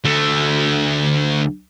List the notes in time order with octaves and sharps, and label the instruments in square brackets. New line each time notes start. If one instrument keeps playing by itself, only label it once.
[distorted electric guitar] D2 A3